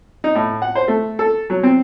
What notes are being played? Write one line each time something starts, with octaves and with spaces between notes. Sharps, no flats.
D#4
A2
F#5
C5
A3
A4
F#3
C4